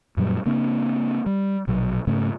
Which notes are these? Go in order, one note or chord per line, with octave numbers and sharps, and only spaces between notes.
F#2 A#2 F#3 G3
C#3 A#3 C4 D4
G3
A#1 B2 F#3
G#2 C#3 A3 C#4